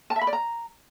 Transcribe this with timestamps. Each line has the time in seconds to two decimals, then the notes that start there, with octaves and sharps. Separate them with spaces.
0.10 A5
0.16 E5
0.21 B5
0.27 D5
0.33 A#5